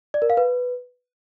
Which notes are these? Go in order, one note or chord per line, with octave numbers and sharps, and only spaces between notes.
D5
A#4
F5
B4